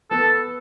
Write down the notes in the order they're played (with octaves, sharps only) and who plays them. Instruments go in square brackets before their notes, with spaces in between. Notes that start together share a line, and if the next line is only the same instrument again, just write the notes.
[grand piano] B3 [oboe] A4